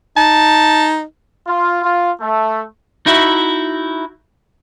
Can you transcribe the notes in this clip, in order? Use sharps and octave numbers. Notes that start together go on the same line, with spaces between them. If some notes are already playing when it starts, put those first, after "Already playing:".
D#4 A5
F4
F4
A3
D#4 E4 F#4 E5